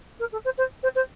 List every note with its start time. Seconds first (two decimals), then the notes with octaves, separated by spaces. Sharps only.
0.20 A#4
0.32 A4
0.45 C5
0.58 C5
0.83 C5
0.95 C5